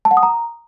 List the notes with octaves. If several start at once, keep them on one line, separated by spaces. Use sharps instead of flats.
A5
F#5
D#6
A#5